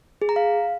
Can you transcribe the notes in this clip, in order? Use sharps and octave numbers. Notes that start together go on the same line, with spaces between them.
G#4
A#5
F5